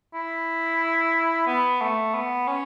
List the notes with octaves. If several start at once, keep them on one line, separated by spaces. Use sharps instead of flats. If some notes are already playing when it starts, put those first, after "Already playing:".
E4
B3
A3
B3
C#4